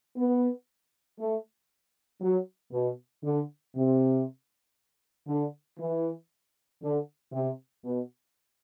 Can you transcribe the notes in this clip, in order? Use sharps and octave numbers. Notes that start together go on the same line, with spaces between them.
B3
A3
F#3
B2
D3
C3
D3
E3
D3
C3
B2